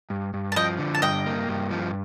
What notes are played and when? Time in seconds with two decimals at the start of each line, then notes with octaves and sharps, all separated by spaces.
0.10 G2
0.34 G2
0.52 A5
0.56 F3 D#5 G5
0.79 D3
0.95 A5
1.02 G2 D#5 G5
1.26 A#3
1.49 G2
1.71 F3